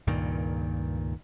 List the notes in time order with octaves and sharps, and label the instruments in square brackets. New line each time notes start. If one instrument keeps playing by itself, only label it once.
[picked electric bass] C#2 G2 A#2 D#3